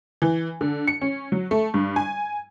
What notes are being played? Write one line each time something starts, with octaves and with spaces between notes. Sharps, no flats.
E3
D3
C#7
C#4
F#3
A3
G2
G#5